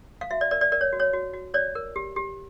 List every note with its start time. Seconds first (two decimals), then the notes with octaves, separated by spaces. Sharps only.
0.21 F5
0.31 F#4 E5
0.41 D5
0.51 A#4 D5
0.61 D5
0.72 A#4 D5
0.81 C#5
0.93 F#4
1.00 C#5
1.13 F#4
1.34 F#4
1.54 C#5 D5
1.75 A#4
1.96 G4
2.16 G4